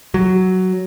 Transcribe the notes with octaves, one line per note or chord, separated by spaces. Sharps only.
F#3